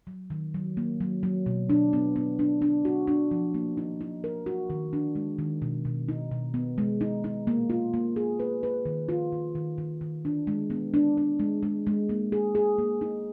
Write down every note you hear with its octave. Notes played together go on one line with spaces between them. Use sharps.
F#3
D#3
F#3
A#3
F#3
F#3
B2
D4
B3
B3
D4
D4
F#4
D4
F3
A#3
D#4
D#4
A#4
F#4
D#3
D4
G#3
D#3
B2
B2
D#4
B2
B3
G#3
D#4
D#4
A#3
F4
A#3
G#4
B4
B4
D#3
F4
D#3
D#3
D#3
D#3
D4
G#3
B3
D4
D4
G#3
G#3
G#3
A#3
G#4
G#4
A#3
D#4